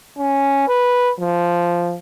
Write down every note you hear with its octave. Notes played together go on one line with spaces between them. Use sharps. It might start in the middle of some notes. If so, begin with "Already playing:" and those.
C#4
B4
F3